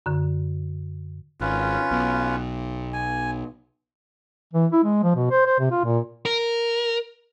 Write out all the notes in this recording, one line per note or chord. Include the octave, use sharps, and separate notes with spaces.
F#2 D3
G#1 C#4 F4 B4
B1 B2
G#5
E3
E4
G#3
F3
B2
C5
C5
C3
F4
A#2
A#4